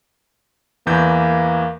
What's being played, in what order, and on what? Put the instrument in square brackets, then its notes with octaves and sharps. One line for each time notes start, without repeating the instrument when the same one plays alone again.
[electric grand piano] E2 E3 G6 [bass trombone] A#3